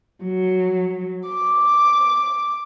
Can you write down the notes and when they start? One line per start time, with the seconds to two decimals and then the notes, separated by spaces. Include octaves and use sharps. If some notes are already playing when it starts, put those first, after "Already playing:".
0.23 F#3
1.28 D6